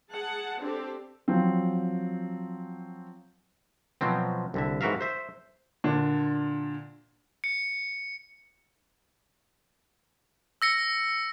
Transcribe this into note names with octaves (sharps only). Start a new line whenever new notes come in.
G#4 F#5 A5
C4 D4 G4 A4
F3 F#3 C4
B2 F3 F#3 C4
C2 D3 E5
G#2 E3 F#4 A#4 E5 F5
C5 E5
A#2 D3 D4
C#7
E6 A#6 C#7